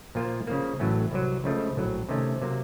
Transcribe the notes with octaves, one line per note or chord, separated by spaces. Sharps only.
A#2 F3 A#3 F4 C5
C#3 F3 A#3
A1 A2 F#3 A3 C#4
C2 C3 F#3
C#2 C#3 F3 A3
A#1 A2 F#3
C3 D#3 A3 C#4
C3 F#3 A#3